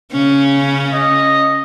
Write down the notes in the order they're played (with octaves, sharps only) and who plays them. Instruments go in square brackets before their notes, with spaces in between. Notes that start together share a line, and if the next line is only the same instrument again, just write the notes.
[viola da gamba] C#3 C#4
[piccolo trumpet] D#5